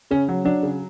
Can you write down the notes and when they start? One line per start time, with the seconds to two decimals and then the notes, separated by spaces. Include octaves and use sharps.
0.11 C#3 C#4
0.29 F#3
0.45 F#3 D4
0.63 C#3